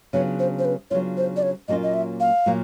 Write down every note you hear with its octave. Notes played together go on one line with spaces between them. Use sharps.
C#3 F#3 B3 D4 F4 C#5
C5
C5
B4
C#3 F#3 B3 D4 F4 C#5
C5
D5
C#5
A#2 F#3 A#3 C#4 F4 D#5
D#5
E5
F5
A#2 F#3 A#3